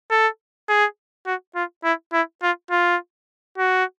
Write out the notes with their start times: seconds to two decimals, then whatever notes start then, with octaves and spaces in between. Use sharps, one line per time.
0.11 A4
0.69 G#4
1.26 F#4
1.55 F4
1.84 E4
2.13 E4
2.43 F4
2.71 F4
3.58 F#4